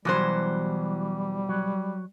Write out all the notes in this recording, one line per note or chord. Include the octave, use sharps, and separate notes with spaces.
E2 B2 E3 F#3 G3 C5
F#3